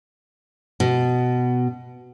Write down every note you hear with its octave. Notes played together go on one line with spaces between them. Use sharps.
B2